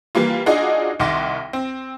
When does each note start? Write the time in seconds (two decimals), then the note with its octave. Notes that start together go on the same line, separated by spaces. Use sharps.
0.15 E3 G3 A#3 F4
0.46 D4 D#4 F4 F#4 G#4 D#5
1.00 C2 D#3 F#5 C6 D6 A#6
1.53 C4